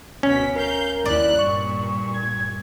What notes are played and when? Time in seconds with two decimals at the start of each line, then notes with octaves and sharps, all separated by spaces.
0.23 D2 B2 C#4 B6
0.56 A#4 F5 G6
1.05 D#2 E4 D5 F#6
1.38 G2 A#2 C#6
2.14 G#6